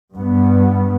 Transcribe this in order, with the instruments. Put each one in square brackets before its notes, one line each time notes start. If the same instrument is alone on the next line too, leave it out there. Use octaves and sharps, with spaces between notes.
[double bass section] G2 B3